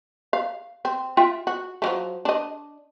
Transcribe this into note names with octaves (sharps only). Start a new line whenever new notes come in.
F5
C4
F4 E5 G5
F#4
F3 F#3 A3
D4 D#5